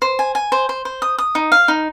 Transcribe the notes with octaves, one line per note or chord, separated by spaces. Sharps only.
C5
G#5
G#5
C5
C5
C5
D#6
D#6
D#4
F5
D#4